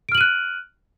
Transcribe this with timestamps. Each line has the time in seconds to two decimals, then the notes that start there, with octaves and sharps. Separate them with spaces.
0.09 D7
0.12 F6
0.15 F#7
0.18 D#7
0.21 F#6